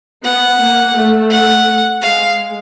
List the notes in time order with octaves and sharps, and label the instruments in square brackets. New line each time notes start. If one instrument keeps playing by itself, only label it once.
[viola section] B3 [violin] F#5
[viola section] A#3
A3
[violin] F#5
[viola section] G#3 [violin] F5